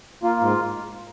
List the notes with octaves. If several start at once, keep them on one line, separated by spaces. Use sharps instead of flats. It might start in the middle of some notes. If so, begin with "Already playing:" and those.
A#3 F4
G#2 F4